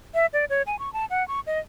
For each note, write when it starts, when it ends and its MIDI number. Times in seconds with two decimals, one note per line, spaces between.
0.14 0.26 76
0.33 0.45 74
0.50 0.62 73
0.67 0.79 80
0.79 0.92 85
0.93 1.05 81
1.10 1.26 78
1.28 1.40 85
1.47 1.59 75